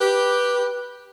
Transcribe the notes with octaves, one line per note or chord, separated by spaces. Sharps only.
G4 B4